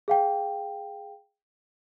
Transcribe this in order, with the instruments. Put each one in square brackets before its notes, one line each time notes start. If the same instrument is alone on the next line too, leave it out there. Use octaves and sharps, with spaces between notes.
[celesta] G#4 F5 G5